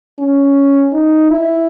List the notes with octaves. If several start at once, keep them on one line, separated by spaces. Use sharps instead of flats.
C#4
D#4
E4